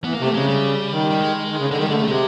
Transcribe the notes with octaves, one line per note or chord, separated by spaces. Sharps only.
E3 B3
A#3
C3 A3
C#3 G#3
G3
D#3
G3
G#3
D#3
C#3
D3 G#3
D#3 G3
D3 G#3
C#3 A3
C3 G#3